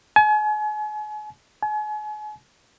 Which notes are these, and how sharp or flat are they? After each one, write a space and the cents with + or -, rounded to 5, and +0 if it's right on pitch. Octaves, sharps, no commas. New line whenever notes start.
G#5 +40
G#5 +40